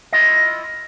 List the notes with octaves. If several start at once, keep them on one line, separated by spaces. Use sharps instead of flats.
E4 F4 D#5